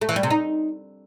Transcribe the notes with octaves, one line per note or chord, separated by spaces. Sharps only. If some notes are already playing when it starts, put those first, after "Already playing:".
A3
E3
G3
C3
D#4